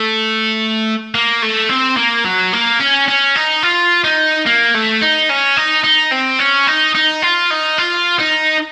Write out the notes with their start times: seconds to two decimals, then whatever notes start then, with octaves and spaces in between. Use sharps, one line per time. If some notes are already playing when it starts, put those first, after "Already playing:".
Already playing: A3
1.15 A#3
1.42 A3
1.70 C4
1.97 A#3
2.25 F#3
2.53 A#3
2.80 C#4
3.08 C#4
3.35 D#4
3.63 F4
4.04 D#4
4.46 A#3
4.74 A3
5.01 D#4
5.29 C#4
5.57 D#4
5.84 D#4
6.12 C4
6.39 C#4
6.67 D#4
6.95 D#4
7.22 F4
7.50 D#4
7.78 F4
8.19 D#4